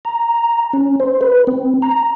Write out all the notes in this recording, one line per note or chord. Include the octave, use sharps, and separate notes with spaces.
A#5
C#4
C5
B4
C4
A#5